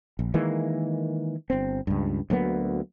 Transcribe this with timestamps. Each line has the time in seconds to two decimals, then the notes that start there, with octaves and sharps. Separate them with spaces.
0.19 A#1
0.34 D#3 E3 G#3 A#3
1.50 G1 C4
1.87 C#2 G2
2.30 D2 F#3 A#3 B3